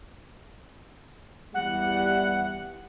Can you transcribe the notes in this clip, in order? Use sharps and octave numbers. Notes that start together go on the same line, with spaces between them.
E2 E3 G3 F#5